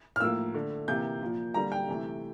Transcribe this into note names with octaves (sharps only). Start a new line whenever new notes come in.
F6
A2 F3 A#3 E6
D3 A3
C3 E3 A#3 G6
A#2 F3 A#3
D3 G3 A#3 A#5
G5
C3 E3 A3